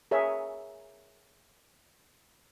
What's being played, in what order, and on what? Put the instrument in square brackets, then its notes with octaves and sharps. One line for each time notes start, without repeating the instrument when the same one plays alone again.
[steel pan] G#4 A#4 C#5 E5